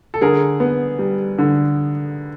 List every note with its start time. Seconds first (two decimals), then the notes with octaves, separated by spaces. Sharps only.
0.14 A4
0.21 D3 G#4 A#4
0.60 B3
0.99 G3
1.38 D3